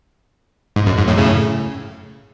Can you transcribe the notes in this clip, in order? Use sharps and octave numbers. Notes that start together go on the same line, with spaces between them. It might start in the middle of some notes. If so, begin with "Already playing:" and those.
G#2
F#2
G#2
F#2 A2
A2 C#3